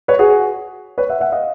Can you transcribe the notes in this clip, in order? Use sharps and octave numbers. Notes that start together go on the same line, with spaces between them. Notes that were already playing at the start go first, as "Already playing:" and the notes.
B4 C#5
F#4 G#4
B4 C#5
E5 F#5
E5 F#5
D#5 F5